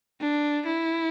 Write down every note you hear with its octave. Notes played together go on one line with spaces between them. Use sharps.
D4
E4